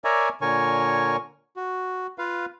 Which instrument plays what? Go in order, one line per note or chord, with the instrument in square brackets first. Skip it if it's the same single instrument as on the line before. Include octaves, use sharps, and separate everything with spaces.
[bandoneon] A#4 C#5 D5 E5 G#5 A#5
A#2 D3 A#4 C#5 G#5 C#6
F#4
F4 B4 F5